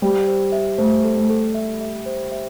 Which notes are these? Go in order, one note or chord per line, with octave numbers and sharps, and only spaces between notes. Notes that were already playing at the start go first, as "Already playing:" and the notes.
G3 C5
C5
E5
A3 C5
A4
A3
A4
E5
E5
C5
E5